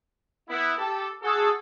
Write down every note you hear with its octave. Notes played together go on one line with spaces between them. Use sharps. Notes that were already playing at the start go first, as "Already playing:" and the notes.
B3 E4
G4 A4
F#4 G#4 A4